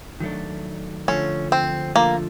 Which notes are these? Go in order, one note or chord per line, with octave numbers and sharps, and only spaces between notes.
D#3 F#3 A3 D4
D3 F3 A3 C#4
C4
D3 F3 A3 A#3